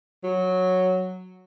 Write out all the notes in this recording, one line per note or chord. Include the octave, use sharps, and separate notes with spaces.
F#3